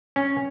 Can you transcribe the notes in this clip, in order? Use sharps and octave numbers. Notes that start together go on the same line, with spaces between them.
C#4